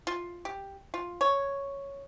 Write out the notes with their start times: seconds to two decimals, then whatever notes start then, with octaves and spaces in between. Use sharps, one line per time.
0.07 F4
0.45 G4
0.94 F4
1.21 C#5